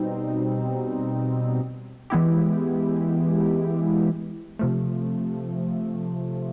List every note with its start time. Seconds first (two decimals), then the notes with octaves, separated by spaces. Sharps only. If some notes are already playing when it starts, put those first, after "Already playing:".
Already playing: B2 G3 C4 D#4
2.10 E3 G#3 B3 E4 G4
4.59 C3 F3 A3